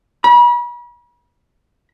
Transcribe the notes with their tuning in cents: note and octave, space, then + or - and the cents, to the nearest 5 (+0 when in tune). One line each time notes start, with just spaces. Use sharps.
B5 -40